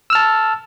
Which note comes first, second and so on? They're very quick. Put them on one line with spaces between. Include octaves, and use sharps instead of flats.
E6 F6 A5